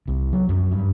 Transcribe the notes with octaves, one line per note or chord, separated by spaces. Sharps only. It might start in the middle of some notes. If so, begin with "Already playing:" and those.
C2
F#3
F#2
G2